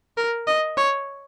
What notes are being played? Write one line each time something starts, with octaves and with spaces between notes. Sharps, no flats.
A#4
D#5
C#5